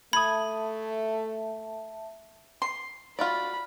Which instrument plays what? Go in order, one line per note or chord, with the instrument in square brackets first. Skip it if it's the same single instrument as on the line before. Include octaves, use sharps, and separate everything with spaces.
[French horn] A3 [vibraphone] E5 A5 [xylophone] B5 [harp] D#6 G#6
[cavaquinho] C6
[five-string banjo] F4 F#4 D5 [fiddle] B5